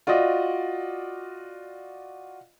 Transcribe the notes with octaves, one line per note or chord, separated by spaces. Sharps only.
F4 F#4 D5 D#5